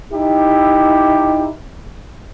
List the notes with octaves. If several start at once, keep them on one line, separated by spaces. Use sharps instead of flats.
D#4 E4 G4